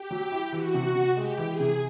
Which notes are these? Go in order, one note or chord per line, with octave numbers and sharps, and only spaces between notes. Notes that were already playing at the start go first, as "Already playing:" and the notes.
Already playing: G4
F#3
E4
E3 F#4
C3
C3
G#3 G4
E3
G#4
C3